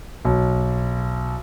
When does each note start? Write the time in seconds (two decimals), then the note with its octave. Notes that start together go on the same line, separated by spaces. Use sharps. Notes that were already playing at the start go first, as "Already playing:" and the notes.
0.25 B1